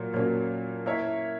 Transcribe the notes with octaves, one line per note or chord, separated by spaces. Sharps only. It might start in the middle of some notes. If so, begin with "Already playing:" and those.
Already playing: A#2 F#3 A#3
A#2 F#3 A#3 C#4
A#3 E4 A#4 C#5 E5